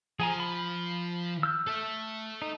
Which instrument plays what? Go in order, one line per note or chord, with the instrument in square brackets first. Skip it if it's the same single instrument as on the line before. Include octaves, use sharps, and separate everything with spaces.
[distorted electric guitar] F3 [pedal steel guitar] G#4 G#5 A#5
[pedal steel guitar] B5
E6 F6 G6
[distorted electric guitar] A4 E5
[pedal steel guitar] D#4